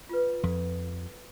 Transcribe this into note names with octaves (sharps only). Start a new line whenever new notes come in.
F4 B4
F2 F3 A4